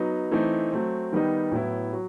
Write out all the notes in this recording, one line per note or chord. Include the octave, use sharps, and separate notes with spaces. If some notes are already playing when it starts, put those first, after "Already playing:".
Already playing: F#3 B3 D#4
E3 A3 C4 D#4
F#3 A3 C4
D#3 G3 B3 D#4
A2 F#3 B3 E4
F#3